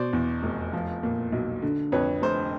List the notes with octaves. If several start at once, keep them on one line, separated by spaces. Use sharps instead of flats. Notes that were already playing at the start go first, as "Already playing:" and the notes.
Already playing: B2 C5 D5
E2
F1
F3
A#2
B1
D3
F2 B4 C#5
F1 C5